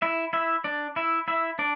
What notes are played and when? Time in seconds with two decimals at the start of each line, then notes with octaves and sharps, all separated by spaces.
0.02 E4 E5
0.33 E4 E5
0.64 D4 D5
0.96 E4 E5
1.28 E4 E5
1.59 D4 D5